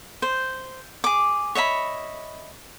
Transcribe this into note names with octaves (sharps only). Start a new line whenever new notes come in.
C5
G#4 D6
C#5 D#5 E5 B5